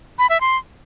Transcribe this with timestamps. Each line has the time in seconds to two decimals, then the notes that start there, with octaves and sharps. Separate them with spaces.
0.19 B5
0.30 E5
0.41 C6